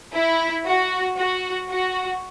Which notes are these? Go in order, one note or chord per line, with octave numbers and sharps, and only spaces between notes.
E4
F#4
F#4
F#4